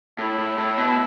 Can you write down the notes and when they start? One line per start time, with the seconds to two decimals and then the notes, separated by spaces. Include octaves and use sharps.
0.19 A2 E4
0.38 A2
0.58 A2
0.78 B2